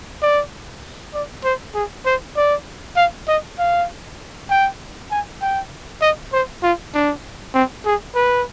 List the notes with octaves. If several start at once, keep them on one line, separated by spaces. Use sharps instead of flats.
D5
D5
C5
G#4
C5
D5
F5
D#5
F5
G5
G#5
G5
D#5
C5
F4
D4
C4
G#4
B4